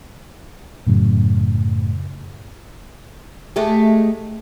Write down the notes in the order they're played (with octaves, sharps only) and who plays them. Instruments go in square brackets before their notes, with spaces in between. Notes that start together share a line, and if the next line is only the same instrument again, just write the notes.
[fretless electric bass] F#2 A2 C#3 F#3
[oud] G#3 A3 G4